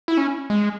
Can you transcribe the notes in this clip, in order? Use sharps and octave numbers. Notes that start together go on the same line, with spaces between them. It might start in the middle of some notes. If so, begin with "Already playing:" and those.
E4
C#4
G#3